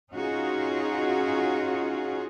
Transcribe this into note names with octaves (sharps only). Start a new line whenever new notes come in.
C#4 D#4 F4 F#4 G#4